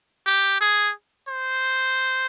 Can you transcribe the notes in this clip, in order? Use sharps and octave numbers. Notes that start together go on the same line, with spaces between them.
G4
G#4
C5